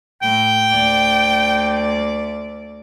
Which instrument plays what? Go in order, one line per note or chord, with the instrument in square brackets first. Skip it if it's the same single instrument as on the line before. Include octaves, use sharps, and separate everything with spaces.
[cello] A2 [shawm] G5
[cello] D2 D5